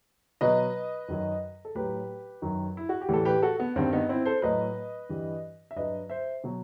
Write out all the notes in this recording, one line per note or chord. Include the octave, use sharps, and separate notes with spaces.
B2 F#3 B4 D#5
F#2 D#3 F#3
A4
A2 F#3 G4 B4
F#2 D#3 F#3
E4
F#4
G4
A2 E3 G3 A4
G4 B4
F#4 A4
B3
G2 D#3 G3 C4
B3 D#4
C4 E4
A4 C5
A2 F#3 B4 D#5
G2 E3 G3
E5
G2 F#3 B4 D#5
C5 E5
B2 F#3